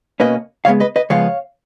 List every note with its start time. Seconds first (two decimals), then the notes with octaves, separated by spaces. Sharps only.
0.20 B2 A#3 C#4 B4 D#5
0.65 C#3 F3 G#3 B3 C#5 F5
0.80 B4 D#5
0.96 B4 D#5
1.10 C#3 F3 G#3 B3 C#5 F5